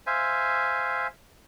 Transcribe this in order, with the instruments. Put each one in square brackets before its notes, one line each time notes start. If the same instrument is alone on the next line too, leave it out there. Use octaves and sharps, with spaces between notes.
[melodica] C5 E5 F5 G#5